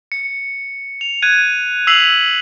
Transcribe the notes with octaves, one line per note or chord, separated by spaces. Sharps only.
C#7
F7
F#6 G#6 D#7
E6 B6 C7 F7 F#7